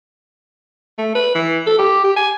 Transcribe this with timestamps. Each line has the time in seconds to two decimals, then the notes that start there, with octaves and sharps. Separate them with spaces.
0.98 A3
1.15 B4
1.35 E3
1.67 A4
1.79 G4
2.04 G4
2.16 G#5